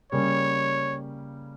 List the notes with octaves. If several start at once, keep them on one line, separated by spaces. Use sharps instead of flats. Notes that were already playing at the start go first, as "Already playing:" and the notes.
C#3 G3 A#3 C#4 C#5